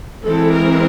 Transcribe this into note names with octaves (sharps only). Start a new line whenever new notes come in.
E3 G#3 C4 A4
A#4